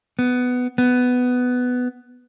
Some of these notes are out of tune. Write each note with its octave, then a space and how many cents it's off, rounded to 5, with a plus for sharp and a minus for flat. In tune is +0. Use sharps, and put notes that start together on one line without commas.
B3 +10
B3 +10